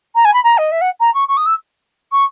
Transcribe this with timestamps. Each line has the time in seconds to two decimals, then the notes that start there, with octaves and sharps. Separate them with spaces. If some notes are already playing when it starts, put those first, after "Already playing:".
0.15 A#5
0.25 G#5
0.33 B5
0.44 A#5
0.57 D#5
0.71 E5
0.81 F#5
1.00 A#5
1.14 C#6
1.28 C#6
1.37 D#6
1.46 E6
2.11 C#6